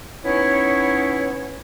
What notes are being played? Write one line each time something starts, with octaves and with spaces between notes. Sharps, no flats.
B3 C#4 D#4 E4 C#5